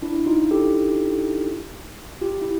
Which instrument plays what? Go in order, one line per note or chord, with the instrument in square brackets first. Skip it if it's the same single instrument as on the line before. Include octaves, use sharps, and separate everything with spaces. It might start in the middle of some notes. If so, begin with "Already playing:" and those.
[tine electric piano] D4 E4
D#4 F4
G4 A4
F4 G4
E4